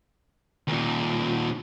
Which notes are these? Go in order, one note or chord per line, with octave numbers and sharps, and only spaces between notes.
D#2 A#2